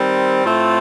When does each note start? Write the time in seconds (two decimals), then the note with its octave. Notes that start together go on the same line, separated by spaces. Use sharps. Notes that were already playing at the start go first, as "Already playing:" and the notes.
Already playing: D#3 G3 C4
0.44 A2 A3 C4 F4